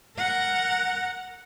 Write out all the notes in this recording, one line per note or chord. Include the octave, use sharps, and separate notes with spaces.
A#4 F#5